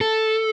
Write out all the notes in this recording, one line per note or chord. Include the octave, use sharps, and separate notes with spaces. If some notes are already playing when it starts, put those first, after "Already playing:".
A4